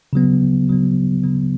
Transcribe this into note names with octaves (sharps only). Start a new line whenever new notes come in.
C#3 F#3 B3
C#3 F#3 B3
C#3 F#3 B3